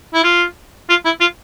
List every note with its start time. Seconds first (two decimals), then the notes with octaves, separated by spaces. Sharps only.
0.14 E4
0.24 F4
0.89 F4
1.05 E4
1.20 F4